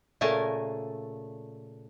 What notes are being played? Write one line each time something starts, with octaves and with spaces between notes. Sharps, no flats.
A#2 C#3 A3 A#4 G#5 A5